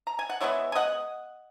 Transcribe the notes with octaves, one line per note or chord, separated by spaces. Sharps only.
A#5
G#5
F#5
E3 G#3 B3 C#5 E5
G#5
D#5 F#5